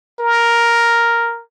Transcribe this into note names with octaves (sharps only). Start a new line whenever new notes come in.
A#4